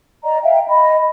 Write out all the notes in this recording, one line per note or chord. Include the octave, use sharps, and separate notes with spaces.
D5 D#5 A#5
E5 F5 G5
D#5 B5